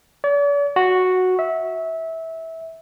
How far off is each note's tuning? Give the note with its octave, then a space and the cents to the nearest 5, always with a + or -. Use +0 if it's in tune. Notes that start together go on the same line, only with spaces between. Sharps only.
D5 -45
F#4 -5
E5 -20